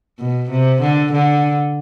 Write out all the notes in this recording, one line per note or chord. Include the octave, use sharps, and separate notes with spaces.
B2
C3
D3
D3